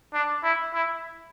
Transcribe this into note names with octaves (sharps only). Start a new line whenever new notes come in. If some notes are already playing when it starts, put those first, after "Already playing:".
D4
E4
E4